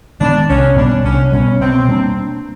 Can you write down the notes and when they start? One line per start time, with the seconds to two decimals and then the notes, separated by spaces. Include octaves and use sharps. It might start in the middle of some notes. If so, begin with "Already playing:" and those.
0.21 D#3 G#3 B3 D4
0.49 C2 C#4
0.76 B2 G3 B3 D4
1.05 C2 C#4
1.32 B2 G3 B3 C#4
1.60 B2 C4
1.88 G3 A#3 D4